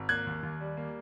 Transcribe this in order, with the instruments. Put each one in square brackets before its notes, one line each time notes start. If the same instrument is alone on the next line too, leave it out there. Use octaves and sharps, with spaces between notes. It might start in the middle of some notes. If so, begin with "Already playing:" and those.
Already playing: [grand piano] G#1
A#3 F#6 G#6
D#2
D#2
G3
A#3